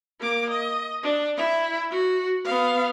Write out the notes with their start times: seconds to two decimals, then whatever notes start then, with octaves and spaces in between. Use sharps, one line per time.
0.20 A#3 D6
0.50 D#5
1.03 D4
1.37 E4 E5
1.91 F#4
2.44 B3 F5